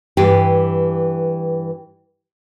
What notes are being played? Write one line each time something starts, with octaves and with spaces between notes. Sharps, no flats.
G2 E3 G4